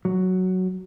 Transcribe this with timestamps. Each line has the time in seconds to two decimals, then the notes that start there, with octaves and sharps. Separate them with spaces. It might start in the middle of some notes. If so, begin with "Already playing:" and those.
0.05 F#3